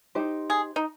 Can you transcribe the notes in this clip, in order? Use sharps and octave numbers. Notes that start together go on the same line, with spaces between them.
D#4 G4 C5
G#4
D#4